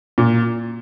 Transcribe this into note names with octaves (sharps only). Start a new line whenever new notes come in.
A#2